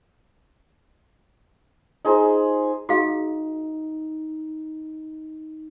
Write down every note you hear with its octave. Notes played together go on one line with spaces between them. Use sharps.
D#4 G#4 C5
D#4 F#4 G#4 F5